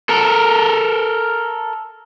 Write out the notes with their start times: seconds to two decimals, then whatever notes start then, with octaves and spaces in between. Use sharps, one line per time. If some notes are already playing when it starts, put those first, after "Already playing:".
0.09 A4 A#4